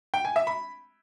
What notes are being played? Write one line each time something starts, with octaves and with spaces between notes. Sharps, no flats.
G5
G#5
E5
B5